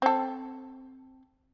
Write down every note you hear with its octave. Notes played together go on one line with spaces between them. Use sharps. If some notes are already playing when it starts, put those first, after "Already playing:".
C4 A4